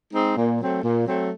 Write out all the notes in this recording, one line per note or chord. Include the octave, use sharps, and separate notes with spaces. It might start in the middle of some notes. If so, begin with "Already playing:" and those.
G#3 C4 D#4
A#2
F#3 A3 C4
A#2
F#3 A3 C4